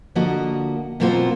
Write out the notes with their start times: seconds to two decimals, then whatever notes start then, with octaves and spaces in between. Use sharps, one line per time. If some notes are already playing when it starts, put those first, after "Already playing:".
0.15 D3 F3 A#3 F#4 D#5
1.00 B2 F#3 A#3 C4 F4 F#4